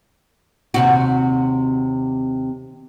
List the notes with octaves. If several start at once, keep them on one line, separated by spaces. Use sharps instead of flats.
D#2 C3 F#4